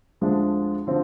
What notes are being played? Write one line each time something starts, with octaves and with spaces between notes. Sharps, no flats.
D2 D3 F3 G#3 D4
D3 F3 C4